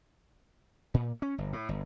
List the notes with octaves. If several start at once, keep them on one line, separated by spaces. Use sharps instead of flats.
A#2
C#4
G1
A2
G1